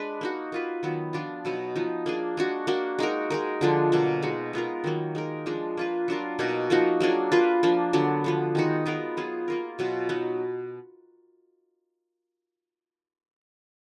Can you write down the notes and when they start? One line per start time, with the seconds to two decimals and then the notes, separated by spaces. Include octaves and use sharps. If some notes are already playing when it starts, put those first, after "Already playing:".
Already playing: G#3 D4 B4
0.21 A#3 D#4 F#4
0.52 A#3 F4 B4
0.83 D#3 F#3 B3
1.13 F3 B3 D4 F4
1.45 B2 F#3 B3 D#4
1.76 F3 B3 D#4
2.06 A#3 D4 G#4
2.37 G#3 D4 F#4
2.67 A#3 D4 F#4
2.99 G#3 D#4 F#4 A#4
3.30 G#3 D#4 A#4
3.61 D3 F3 G#3 D4
3.92 B2 F#3 A#3
4.23 G#3 D#4 F#4
4.53 G#3 B3 F4 A#4
4.84 D#3 F#3 A#3
5.15 G#3 D#4 A#4
5.46 F3 G#3 D4
5.77 A#3 F4 B4
6.08 F#3 D4 F4 A#4
6.39 B2 A#3 D#4 F#4
6.70 F3 A#3 D#4 F#4
7.00 F#3 A#3 D4 G#4
7.32 A#3 F4 B4
7.63 F3 A#3 D4
7.93 D3 F#3 B3 D4
8.24 D3 F3 B3
8.55 D#3 G#3 D#4 F#4
8.86 G#3 B3 F4 A#4
9.17 F#3 B3 F4 G#4
9.48 A#3 F4 A#4
9.79 B2 F#3 B3 F4
10.09 F#3 B3 D#4